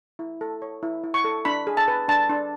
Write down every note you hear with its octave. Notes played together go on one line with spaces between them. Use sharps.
E4
A4
C#5
E4
E4
C#6
A4
D4 B5
G#4
A5
B4
D4 A5
D4